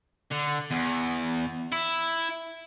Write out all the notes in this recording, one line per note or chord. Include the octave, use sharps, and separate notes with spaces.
D3
E2
E4